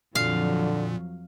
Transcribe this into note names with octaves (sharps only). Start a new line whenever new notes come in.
F2 A#2 D3 F#3 F5